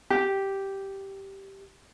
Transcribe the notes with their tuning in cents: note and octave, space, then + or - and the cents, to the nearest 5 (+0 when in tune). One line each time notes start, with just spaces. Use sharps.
G4 -5